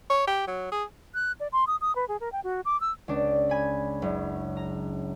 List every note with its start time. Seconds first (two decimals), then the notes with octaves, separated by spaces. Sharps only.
0.10 C#5
0.27 G4
0.47 F#3
0.72 G#4
1.14 F#6
1.40 D5
1.52 C6
1.67 D#6
1.81 D#6
1.95 B4
2.08 G#4
2.20 A#4
2.32 G5
2.44 F#4
2.65 D6
2.81 E6
3.08 C#2 D4
3.49 G#5 B5
4.02 F#1
4.57 A#5